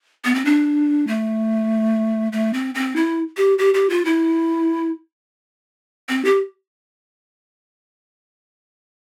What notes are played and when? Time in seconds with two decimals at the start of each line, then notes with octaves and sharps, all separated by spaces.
0.25 B3
0.35 C4
0.45 D4
1.07 A3
2.32 A3
2.53 C4
2.75 C4
2.96 E4
3.37 G4
3.58 G4
3.74 G4
3.89 F4
4.05 E4
6.09 C4
6.25 G4